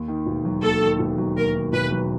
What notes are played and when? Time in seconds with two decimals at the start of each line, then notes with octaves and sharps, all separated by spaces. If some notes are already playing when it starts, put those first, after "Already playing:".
Already playing: D#2
0.08 D#3
0.26 E1
0.45 F#3
0.63 D#2 A4
0.82 D#3
0.99 E1
1.18 F#3
1.37 D#2 A#4
1.54 D#3
1.73 E1 B4
1.91 F#3